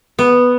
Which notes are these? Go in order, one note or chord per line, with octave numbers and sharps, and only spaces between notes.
B3